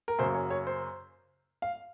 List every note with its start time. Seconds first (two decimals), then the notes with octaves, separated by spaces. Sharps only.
0.08 A#4
0.18 F#2 C#3 F#3 A#3 C5
0.34 C#5
0.50 C#5
0.67 C5
1.62 F5